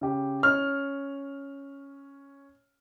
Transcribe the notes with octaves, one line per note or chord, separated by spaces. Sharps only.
C#3 G4
C#4 F6